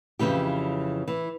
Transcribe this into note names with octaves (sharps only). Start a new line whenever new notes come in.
F2 A2 C#3 E3 G4
E3